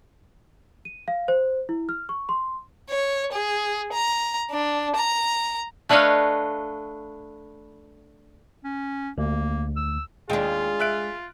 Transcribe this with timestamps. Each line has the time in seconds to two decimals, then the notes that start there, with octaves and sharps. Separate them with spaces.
0.85 D#7
1.08 F5
1.28 C5
1.69 E4
1.89 F6
2.09 C#6
2.29 C6
2.90 C#5
3.32 G#4
3.93 A#5
4.51 D4
4.96 A#5
5.89 A3 D4 B4 C#5 D#5 F5
8.64 C#4
9.18 D2 A#3
9.76 E6
10.30 D#2 G#3 D4 F4 G#4 G5
10.80 E5 F#6 D7